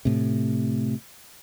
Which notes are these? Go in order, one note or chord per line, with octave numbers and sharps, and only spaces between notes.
A2 C3